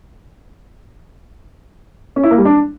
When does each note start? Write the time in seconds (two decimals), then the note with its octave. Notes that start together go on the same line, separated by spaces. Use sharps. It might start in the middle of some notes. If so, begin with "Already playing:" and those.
2.16 C#4
2.23 E4
2.31 A#3
2.38 G3
2.45 D4